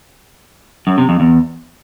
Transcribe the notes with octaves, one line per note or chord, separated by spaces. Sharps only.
F#2
C3
F2
E2